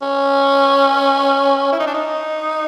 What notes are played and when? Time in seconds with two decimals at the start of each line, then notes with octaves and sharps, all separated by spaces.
0.02 C#4
1.72 E4
1.80 D#4
1.87 D4
1.94 D#4